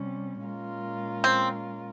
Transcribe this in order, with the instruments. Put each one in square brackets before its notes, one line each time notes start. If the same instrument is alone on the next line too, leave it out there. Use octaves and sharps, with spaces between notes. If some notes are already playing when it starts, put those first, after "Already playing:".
Already playing: [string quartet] C3 G3 C#4
A#2 G#3 C#4 F4 A#4
[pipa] C4